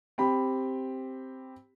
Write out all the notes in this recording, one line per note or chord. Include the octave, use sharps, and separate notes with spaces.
C4 G4 B5